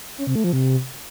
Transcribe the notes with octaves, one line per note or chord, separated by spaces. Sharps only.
C#4
C3
A3
F3
C3